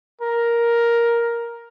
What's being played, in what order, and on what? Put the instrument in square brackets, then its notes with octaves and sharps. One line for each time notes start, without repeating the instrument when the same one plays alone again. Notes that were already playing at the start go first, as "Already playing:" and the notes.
[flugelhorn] A#4